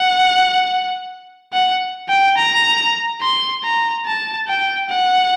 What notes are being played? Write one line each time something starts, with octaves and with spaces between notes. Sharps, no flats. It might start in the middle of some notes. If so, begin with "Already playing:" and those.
Already playing: F#5
F#5
G5
A#5
C6
A#5
A5
G5
F#5